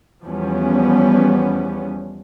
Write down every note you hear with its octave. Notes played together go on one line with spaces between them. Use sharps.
E2 F3 G3 B3 C#4